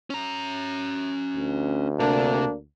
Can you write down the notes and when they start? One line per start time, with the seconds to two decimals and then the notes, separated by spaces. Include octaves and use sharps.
0.10 C#4 A#5
1.36 D2
2.00 C3 A#3 D4